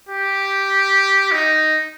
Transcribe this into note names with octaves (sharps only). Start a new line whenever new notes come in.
G4
D#4